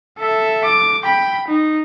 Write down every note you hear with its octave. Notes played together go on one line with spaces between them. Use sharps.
A4 E5
D6
G5 B5
D#4